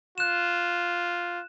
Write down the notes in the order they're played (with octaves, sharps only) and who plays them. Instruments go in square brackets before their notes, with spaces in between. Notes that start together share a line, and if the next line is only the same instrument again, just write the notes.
[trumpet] F4 [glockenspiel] F#6 E7